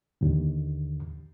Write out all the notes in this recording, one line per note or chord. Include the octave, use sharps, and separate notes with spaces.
D#2 D3